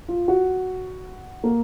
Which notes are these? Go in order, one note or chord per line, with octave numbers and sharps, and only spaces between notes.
F4
F#4
A#3